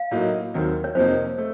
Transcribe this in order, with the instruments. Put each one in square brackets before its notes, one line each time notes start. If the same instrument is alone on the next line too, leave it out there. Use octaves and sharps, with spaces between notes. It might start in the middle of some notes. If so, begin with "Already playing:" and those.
Already playing: [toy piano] F5
[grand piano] A2 F#3 A#3 D#4
D#2 D#3 F#3 C4
[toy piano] C#5
[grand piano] F2 C3 F3 A#3 D#4 [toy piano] C5
[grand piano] A3